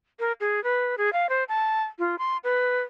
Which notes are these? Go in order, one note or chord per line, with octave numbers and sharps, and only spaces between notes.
A#4
G#4
B4
G#4
F5
C5
A5
F4
C6
B4